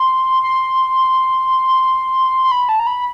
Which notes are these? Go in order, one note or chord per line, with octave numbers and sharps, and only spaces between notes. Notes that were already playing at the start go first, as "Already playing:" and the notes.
Already playing: C6
C6
C6
B5
A5
A#5
B5